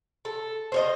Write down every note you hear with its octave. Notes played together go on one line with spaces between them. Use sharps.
A4
C5 C#5 D#5